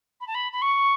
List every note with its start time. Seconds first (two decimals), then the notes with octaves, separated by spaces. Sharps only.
0.20 B5
0.27 A5
0.34 B5
0.52 B5
0.62 C#6